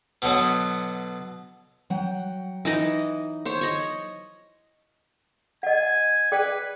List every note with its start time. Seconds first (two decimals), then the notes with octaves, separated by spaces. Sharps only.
0.22 B2 D3 F#3 B3
1.90 F#3 F#5 G5
2.65 E3 D#4 D#5
3.45 C5 C#5
3.61 C#5 D#5
5.63 D#5 F#5 G#5
6.32 G#4 B4 D5 G5